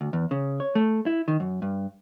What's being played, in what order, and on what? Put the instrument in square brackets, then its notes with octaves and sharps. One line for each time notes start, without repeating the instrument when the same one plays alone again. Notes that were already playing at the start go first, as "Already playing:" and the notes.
[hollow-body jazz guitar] D2
E2
C#3
C#5
A3
E4
D#3
F#2
G2